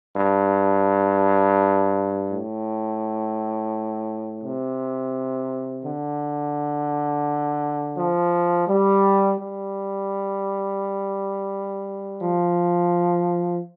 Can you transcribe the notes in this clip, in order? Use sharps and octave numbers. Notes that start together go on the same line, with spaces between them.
G2
A2
C3
D3
F3
G3
G3
F3